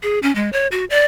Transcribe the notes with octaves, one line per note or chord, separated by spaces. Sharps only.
G#4
C#4
G#3
C#5
F#4
D5